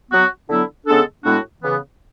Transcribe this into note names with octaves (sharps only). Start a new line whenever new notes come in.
F#3 B3 F#4
D3 F#3 B3 E4
C#3 G#3 B3 D4 A4
A2 G#3 B3 D4 F#4
C#3 E3 B3